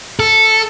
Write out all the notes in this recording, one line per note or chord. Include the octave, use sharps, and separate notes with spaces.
A4